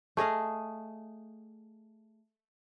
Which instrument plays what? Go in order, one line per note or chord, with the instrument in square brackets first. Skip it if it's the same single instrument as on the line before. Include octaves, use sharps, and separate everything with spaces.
[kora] A3 G#4 D#5 F5